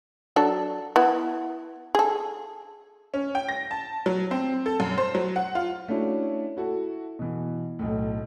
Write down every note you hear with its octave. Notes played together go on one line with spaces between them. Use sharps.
F#3 D4 A4
B3 E4
G#4 A4
C#4
G5
A#6
A5
F#3
C4
A4
F#2
C5
F#3
F#5
F4
A3 C#4 D4 E4 F#4
E4 F#4 A4
B2 E3
B1 A2